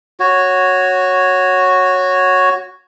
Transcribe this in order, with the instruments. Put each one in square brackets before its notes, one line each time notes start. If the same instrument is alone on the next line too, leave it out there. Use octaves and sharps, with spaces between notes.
[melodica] F#4 C#5